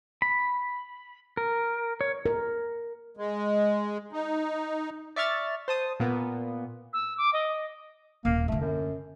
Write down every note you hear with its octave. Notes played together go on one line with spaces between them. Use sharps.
B5
A#4
C#5
A#4
G#3
D#4
D5 E5 C#6 F6 A6
C5 A5 D#6
A#2 A#3 B3
E6
D6
D#5
D#1 A#3
D3 A3 E4
F#2